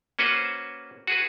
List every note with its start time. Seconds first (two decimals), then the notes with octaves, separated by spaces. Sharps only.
0.19 A#3 C#4 F#4 B4 C5
1.07 F#4 G#4 B4